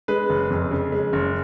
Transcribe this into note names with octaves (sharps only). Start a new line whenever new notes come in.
G#3 B4
F#1
F2
C#3
G#3
F#1